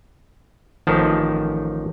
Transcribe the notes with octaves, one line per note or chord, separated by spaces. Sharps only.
A1 D#3 F3 A5